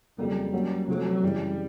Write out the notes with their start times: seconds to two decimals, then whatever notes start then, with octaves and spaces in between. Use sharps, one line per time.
0.18 F2 C#3 F#3 G3 A#3
0.53 F#3 A#3 C#4
0.88 C3 F3 F#3 A3 C4
1.23 F#2 C#3 E3 G3